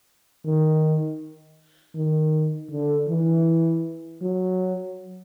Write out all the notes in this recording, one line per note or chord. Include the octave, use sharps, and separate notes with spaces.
D#3
D#3
D3
E3
F#3